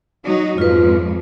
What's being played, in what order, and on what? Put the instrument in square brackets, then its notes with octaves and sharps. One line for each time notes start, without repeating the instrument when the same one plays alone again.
[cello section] F#3 D#4 F#4
[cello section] F2 G#2 F3 [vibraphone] F4 B4